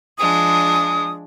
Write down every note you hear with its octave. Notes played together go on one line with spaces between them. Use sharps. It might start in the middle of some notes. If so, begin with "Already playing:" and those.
F3 G#3 D4 D#6